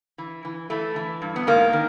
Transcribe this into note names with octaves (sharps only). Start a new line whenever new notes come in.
E3
E3
E3 A3
E3
G2
B3
G#2 A#3
D#3